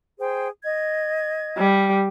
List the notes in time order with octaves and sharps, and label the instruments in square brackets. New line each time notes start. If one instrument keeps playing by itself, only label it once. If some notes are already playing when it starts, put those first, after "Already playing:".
[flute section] G#4 C5 G5
D#5 G#6
[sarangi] G3